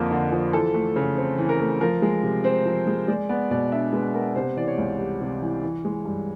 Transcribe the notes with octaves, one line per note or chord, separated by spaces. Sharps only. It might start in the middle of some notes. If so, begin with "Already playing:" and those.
Already playing: F2 D3 F3 A#3
D3
F3
E3 A4
A3
C#3
C4
E3
A#4
A3
F3 A#4
G#3
C3
C4 C5
F3
G#3
G#3 D5
B3 D5
B2 D5
D4 E5
G#3 B4
B3 A#4
C3 C5
E3 D5
C#5
C#2
G3
C3
E3
E3
G#3
G2